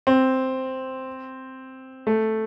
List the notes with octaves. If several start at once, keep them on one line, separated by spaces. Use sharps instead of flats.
C4
A3